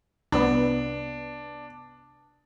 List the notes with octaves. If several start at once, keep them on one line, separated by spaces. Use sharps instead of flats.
C2 B3 D4